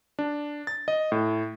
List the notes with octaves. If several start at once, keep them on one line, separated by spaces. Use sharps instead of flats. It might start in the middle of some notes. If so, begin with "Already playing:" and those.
D4
A6
D#5
A2